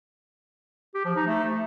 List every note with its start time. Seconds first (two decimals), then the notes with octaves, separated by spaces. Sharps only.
0.94 G4
1.05 F3
1.16 D#4
1.27 A3